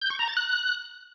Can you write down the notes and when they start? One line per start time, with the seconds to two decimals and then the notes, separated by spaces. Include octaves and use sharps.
0.02 G6
0.10 C#6
0.19 A#5
0.28 A6
0.37 F#6